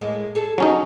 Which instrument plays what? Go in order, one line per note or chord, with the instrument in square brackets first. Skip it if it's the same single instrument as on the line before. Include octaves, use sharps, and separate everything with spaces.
[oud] A2 G#3 A#3
G#4 A4
[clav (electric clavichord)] F#3 C#4 D#4